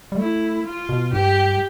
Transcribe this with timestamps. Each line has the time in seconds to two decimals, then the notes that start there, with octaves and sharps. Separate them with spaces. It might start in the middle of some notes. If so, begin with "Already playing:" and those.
0.12 G3
0.17 A3 E4
0.66 F4
0.89 B2
1.13 G2 G4